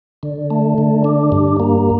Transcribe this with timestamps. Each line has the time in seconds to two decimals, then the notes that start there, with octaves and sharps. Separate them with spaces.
0.23 D3
0.50 A3
0.78 D3
1.04 D4
1.32 G2
1.60 A#3